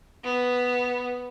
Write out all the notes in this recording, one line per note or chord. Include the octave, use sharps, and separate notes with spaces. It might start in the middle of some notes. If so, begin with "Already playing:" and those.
B3